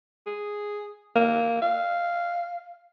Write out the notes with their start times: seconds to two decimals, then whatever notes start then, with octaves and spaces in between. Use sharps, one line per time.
0.27 G#4
1.16 A#3
1.62 F5